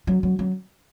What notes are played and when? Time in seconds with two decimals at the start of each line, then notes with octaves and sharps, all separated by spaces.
0.07 F#3
0.23 F#3
0.39 F#3